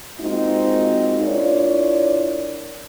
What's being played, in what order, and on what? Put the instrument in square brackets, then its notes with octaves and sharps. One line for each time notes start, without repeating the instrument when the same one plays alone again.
[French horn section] G#3 A#3 C4 D#4 F4 F#4
D4 E4 F4 A#4 C#5 D5